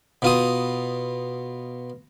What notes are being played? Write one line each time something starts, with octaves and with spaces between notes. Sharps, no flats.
B2 F4 D#6